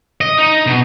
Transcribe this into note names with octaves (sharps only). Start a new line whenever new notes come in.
D#5
D#4
B2